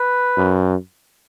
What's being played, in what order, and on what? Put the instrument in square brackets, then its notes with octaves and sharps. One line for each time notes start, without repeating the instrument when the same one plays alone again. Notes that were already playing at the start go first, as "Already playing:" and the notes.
Already playing: [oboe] B4
[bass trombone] F#2